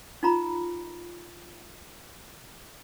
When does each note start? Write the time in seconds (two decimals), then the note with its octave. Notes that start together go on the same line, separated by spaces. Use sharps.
0.23 D#4 F4 A#5 B5